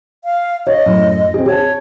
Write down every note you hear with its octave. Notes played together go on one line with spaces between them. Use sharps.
F5
C#5 D#5
F#2 A2
C4 G#4
G#4 C#5 A5